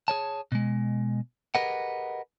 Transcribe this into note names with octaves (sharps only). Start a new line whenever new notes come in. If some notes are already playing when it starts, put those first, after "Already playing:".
G#4 C#5 A5
B2 G#3
G4 G#4 A#4 B4 D#5 F#5